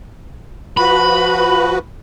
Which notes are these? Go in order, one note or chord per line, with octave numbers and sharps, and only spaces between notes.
F3 F#4 B4 B5